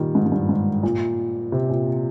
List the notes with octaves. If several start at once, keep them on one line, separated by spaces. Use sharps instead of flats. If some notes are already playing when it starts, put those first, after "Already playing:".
Already playing: A#2 D#3 G3
G#2
G#2
G2
G#2
A#2
C3
A#2